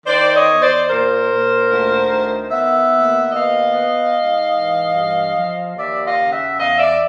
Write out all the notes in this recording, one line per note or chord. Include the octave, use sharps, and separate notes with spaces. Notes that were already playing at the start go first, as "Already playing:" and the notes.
D#3 C5 D5
C#5 D#5
E2
C5 D5
A#2 A#4 C5
A#2
D2
D#3
B3 E5 F#5
D#2
B3 D#5 F5
B3
G#2
E3
G2
F3
D#2 D5 E5
D#5 F5
C#3
E5 F#5
E2 D#5 F5
D5 E5